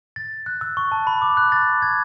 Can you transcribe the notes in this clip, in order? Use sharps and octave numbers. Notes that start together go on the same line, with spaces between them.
A6
F#6
E6
C#6
A5
B5
D6
F#6
A6
G#6